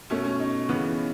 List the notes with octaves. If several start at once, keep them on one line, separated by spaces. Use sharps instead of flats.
B2 A3 C#4
C#4
D#4
C#3 E3 B3